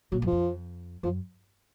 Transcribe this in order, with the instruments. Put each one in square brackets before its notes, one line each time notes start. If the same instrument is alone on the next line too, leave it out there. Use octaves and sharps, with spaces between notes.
[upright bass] A#2 [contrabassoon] F#3
[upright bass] F#2
[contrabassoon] F3
[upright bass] F2
[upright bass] F#2 [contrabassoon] F3